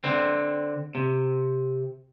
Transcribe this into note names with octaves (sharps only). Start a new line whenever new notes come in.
D3 C4
C3